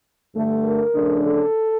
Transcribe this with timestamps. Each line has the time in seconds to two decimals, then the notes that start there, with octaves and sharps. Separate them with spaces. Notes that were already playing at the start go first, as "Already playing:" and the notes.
0.35 G2 D3 A3
0.65 A#4
0.95 C#3 F3 A3 D4
1.25 A4